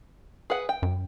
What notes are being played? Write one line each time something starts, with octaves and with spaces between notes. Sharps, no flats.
G#4 B4 F#5
G5
F#2